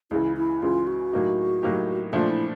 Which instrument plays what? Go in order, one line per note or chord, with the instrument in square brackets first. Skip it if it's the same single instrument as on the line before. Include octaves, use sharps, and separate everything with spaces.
[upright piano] C#2 C#3 E3 [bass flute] E4
[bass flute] E4
[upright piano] C#2 C#3 E3 [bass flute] F4
[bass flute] F#4
[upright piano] A2 F#3 A#3 D#4 G4
A2 F#3 A#3 D#4 G4
[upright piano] A#2 F3 A3 D4 [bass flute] F4
[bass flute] E4